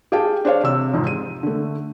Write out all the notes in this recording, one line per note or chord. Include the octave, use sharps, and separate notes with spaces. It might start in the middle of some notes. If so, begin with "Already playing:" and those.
G4 G#4 F5 G5 A5
D4 C5 C#5 F5
C3 E6
F2 G#2 C3
D#7
D3 A3